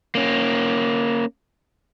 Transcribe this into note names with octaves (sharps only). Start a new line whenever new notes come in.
A#3 C#4